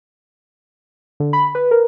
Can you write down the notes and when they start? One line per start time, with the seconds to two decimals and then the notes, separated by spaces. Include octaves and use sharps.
1.20 D3
1.33 B5
1.55 B4
1.71 A#4